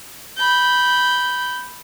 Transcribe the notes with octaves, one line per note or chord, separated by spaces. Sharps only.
B5 G6